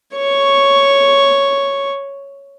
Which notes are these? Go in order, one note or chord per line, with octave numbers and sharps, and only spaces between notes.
C#5 C#6